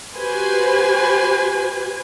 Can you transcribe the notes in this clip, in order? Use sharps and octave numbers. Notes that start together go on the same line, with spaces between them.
F#4 G4 B4 C5 G#5